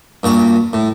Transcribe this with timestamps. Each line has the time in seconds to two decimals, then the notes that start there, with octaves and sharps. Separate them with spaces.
0.23 G2 A#2 F#4
0.73 A2